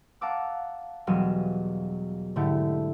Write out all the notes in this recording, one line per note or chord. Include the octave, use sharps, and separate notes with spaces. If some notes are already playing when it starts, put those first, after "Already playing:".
F5 F#5 A5 A#5 D6 E6
E1 F#3 G3 F6 D#7 E7
G#2 D3 A3 E4 G4